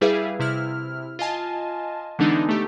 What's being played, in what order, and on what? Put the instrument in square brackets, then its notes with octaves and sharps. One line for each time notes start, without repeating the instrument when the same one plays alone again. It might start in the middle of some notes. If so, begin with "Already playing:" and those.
[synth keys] G3 E4 G#4 B4 E5 F5
C3 E4 F6
F4 D#5 G#5 A5
D3 E3 G#3 B3 D4 D#4
A3 G4